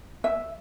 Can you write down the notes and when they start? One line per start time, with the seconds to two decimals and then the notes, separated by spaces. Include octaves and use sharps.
0.24 E5